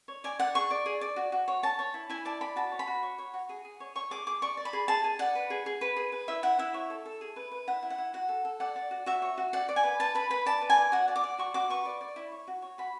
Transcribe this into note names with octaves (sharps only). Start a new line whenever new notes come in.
C#5
D5 G#5
D5 F#5
G#4 C#6
D5
G#4
D5
F#4
F#4
C#5
C#5 A5
C#5
E4
E4 G#5
D5 A5
D5 B5
F#4 A5
C#5
B5
F#4
C#5
C#5
F#4
G#4
G#4
C#5
C#5 C#6
G#4 D6
G#4 D6
D5 C#6
D5
B5
G#4
G#4 A5
G#4
D5 F#5
B4
G#4
G#4
B4
G#4
B4
E4 E5
E4 F#5
E4 E5
C#5
A4
A4
G#4
B4
B4
E4 F#5
E4
F#5
E4
F#4 F#5
A4
A4
D5 F#5
D5
F#4
F#4 E5
C#5
F#4
D5 F#5
D5
G#5
B4
B4 A5
B4 B5
B4 B5
D5 A5
B4
G#5
D5
F#4 F#5
D5
D6
D5
F#4 C#6
F#4 D6
B4 C#6
D5
D5
E4
C#5
F#4
C#5
F#4 B5